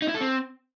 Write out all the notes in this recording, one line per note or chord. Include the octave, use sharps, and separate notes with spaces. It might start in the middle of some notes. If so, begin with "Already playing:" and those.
D#4
E4
A4
C4